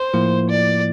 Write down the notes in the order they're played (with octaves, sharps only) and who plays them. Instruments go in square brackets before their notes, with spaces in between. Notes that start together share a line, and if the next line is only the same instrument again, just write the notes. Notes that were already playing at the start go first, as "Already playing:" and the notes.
Already playing: [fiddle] C5
[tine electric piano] A2 F3 A#3 E4
[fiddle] D5